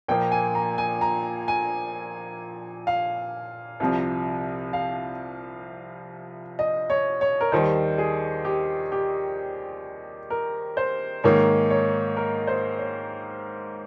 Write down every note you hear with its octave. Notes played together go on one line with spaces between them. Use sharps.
A#2 F3 A#3 G5
G#5
A#5
G#5
A#5
G#5
F5
C2 C3 F3
F5
D#5
C#5
C#5
A#4
D#2 D#3 G3 C5
G#4
G4
G4
A#4
C5
G#2 D#3 A#3 C#5
C#5
A#4
C5
C#5